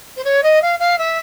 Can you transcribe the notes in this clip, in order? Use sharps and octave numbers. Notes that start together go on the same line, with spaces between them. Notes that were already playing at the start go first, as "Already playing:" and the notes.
C5
C#5
D#5
F5
F5
E5